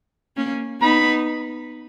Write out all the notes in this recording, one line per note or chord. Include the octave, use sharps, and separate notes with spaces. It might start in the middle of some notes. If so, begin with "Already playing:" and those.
A#3 C#4
B3 D#4 B5